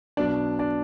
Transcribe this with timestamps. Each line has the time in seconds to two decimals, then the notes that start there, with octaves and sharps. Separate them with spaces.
0.17 B1 B2 F#3 B3 D4 D5
0.59 D4 D5